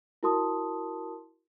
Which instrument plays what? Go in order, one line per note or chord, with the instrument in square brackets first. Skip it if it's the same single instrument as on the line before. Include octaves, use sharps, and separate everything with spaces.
[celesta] E4 F#4 A#4 A5 C6 D#6